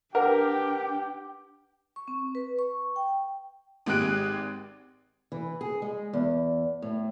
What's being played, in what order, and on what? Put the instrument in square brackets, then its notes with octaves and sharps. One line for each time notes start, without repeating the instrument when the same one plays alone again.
[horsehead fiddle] D4 G5 [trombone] G4 [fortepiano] A#4 [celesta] B4 F#5
[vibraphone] C#6
C4
B4
C#6
G5
[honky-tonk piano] G#1 G#3 G4 F#6 D7
[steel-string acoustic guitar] E3
G#4
G#3
E2
A2